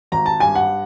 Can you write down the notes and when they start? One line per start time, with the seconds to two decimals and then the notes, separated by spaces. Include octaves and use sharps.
0.12 G#1 A#5
0.26 A5
0.40 G2 G#5
0.55 F#5